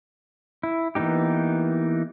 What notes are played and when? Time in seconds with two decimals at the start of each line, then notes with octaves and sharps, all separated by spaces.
0.63 E4
0.95 E3 A#3 B3 D#4 G4